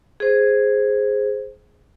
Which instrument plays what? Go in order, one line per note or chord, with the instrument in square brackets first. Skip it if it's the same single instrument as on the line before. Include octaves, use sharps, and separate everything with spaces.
[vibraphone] G#4 C5